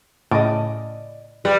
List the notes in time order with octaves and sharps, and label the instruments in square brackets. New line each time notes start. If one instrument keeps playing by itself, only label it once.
[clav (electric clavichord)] A2 C#3 [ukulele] D5 D#5
[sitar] G3 [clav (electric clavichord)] B4